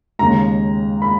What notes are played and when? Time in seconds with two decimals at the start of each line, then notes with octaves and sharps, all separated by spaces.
0.19 D#2 C#3 G#3 A#5
1.02 B5